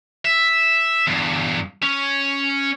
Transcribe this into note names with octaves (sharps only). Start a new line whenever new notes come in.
E5
E2 G2
C#4